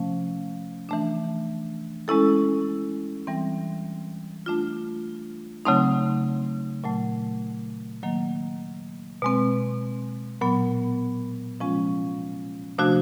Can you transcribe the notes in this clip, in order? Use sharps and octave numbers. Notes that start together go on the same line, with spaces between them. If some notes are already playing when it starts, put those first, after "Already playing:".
Already playing: C3 F3 A3 C#4
E3 A3 D4
G#3 C#4 E4 A4
E3 G3 C4
A3 D4 F4
C#3 F#3 A3 C4 D#4
A#2 F#3 A3
D#3 F#3 A#3
B2 G#3 C4
A#2 F#3 B3
C3 F3 G#3 C#4 F4
C3 F3 A3 D4 F#4